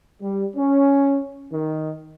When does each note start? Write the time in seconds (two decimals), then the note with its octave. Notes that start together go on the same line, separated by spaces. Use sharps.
0.21 G3
0.56 C#4
1.52 D#3